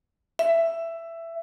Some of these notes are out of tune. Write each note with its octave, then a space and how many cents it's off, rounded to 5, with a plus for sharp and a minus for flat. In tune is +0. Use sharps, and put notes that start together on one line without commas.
E5 +15